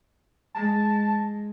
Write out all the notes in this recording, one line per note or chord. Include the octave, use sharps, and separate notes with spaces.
G#3 A5